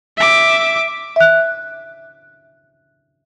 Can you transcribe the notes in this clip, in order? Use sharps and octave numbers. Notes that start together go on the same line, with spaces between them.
E5 D6
E5 F#6